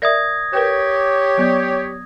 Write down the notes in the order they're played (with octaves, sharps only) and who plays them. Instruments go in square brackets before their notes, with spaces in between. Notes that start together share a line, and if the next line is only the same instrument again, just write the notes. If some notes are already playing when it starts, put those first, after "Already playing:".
[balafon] A#4 D5 E5 [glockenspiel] D#6 G#6 A#6
[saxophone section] G4 C#5 [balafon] A#4 B4 G5
[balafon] F#3 B3 D5